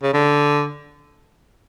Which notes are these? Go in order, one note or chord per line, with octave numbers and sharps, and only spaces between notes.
C#3
D3